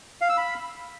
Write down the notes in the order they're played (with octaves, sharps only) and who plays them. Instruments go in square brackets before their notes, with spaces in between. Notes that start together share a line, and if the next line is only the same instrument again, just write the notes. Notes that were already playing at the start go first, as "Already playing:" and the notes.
[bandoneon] F5
E6
B5